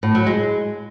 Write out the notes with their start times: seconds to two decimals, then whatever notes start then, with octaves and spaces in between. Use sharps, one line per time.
0.03 A2
0.15 F#3
0.26 G#3